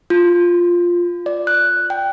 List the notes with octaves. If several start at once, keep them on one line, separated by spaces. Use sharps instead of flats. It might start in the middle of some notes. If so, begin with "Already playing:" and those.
F4
D5
F#6
G5